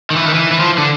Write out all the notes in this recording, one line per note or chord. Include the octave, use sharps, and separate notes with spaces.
D#3
E3
D#3
E3
E3
F3
D3